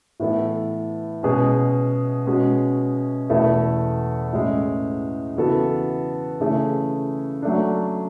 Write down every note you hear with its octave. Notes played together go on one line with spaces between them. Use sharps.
A2 E3 B3 E4 A4
B2 G#3 C#4 G#4
B2 G#3 C#4 F#4
E2 B2 A3 E4 A4
A2 G#3 C#4
C#3 E3 B3 F#4 A4
C#3 E3 A3 C#4 G#4
F#3 A3 D4